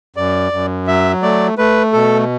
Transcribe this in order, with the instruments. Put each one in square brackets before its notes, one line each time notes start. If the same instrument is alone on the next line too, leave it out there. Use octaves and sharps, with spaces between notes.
[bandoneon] F#2 D5
F#2
F#3 E5
A3 D5
A3 B4
B2 A4